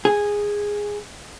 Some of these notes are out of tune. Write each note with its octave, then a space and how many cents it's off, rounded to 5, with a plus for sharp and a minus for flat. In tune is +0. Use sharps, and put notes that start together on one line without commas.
G#4 -10